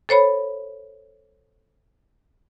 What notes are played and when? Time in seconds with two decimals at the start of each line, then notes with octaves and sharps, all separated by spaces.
0.09 A4 C5 C#5 B5